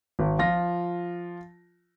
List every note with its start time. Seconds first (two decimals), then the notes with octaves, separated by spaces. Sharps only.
0.19 G#1
0.39 F3 F4 A#6